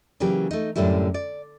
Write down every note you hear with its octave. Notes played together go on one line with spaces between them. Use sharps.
C#3 E3 F#3 A#3 G4
A3 D#4
F#2 A2 D3 G3 E4
D5